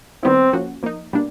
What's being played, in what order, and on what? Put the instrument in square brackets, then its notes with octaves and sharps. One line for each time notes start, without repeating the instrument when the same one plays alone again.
[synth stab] D#3 G3 B3 E4 [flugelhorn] C4
[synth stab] F3 A#3 C#4 F#4
F3 A#3 D#4
B2 G3 A#3 D4